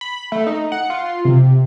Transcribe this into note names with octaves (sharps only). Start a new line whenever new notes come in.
B5
A3
D#4
F#5
F4
C3